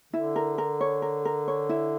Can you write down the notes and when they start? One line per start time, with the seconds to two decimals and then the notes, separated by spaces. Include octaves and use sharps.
0.13 D3 E4
0.36 A#4
0.58 A#4
0.81 C#5
1.02 A#4
1.25 A#4
1.48 C#5
1.69 E4